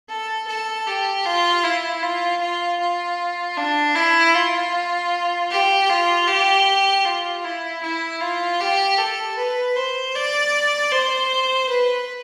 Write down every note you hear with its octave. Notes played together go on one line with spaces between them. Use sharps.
A4
A4
G4
F4
E4
F4
F4
F4
D4
E4
F4
G4
F4
G4
F4
E4
E4
F4
G4
A4
B4
C5
D5
C5
B4